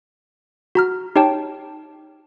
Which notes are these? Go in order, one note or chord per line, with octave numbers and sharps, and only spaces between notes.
F#4 A#5 F6
D#4 G4 C#5 G5 A5